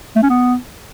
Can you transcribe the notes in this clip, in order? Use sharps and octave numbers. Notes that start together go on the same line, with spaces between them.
A3
C#4
B3